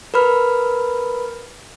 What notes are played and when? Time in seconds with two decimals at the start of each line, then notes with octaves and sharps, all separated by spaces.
0.14 A#4 B4 B5 F6